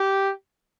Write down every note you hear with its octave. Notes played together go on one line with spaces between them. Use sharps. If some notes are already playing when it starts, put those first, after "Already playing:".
Already playing: G4